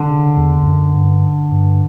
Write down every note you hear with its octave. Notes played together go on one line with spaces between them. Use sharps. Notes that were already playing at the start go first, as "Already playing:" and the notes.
Already playing: D3
C#3
E2
E2
F#2
G2
G2